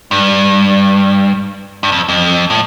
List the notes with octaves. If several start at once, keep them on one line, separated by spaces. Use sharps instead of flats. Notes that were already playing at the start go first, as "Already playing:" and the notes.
G2
G2
F2
F2
A2